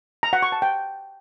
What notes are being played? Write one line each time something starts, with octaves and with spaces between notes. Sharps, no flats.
A#5
F#5
C#6
A5
G5